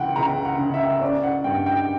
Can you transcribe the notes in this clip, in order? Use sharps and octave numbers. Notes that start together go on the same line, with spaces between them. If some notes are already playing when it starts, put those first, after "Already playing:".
Already playing: C#2 E3 F#5 G5
C#2 A#5
F#5
C#3
E5
C#4 D5
F#5
G2 G5
G5